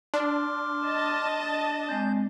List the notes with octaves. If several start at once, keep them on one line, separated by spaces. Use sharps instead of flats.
D4 C6 D6 F6
D#5 A5
G#3 C4 G6